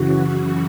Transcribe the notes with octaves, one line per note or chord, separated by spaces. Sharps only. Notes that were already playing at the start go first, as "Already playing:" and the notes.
Already playing: F#2 C#3 E3 F#4